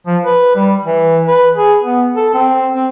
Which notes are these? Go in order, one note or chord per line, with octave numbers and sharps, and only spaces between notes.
F3
B4
G3
E3
B4
G#4
B3
A4
C4
C4